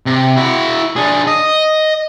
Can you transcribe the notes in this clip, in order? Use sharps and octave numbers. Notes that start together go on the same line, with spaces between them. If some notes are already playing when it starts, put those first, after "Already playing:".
C3
E4 F#4
D4 G#4
D#5